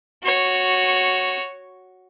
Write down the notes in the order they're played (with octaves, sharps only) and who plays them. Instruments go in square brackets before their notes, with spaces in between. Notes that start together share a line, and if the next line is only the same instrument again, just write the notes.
[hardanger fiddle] F#4 C#5